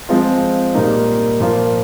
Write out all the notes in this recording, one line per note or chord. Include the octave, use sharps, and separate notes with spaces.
F3 G#3 C4 F4
A#2 G3 A#3 D#4
A#2 F3 A#3 F4